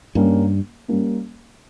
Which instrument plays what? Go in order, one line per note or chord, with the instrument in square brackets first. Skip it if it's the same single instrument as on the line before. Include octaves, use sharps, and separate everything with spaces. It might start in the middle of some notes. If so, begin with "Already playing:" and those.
[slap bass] G2 [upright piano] G3 A#3 C#4
[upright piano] G3 A#3 C#4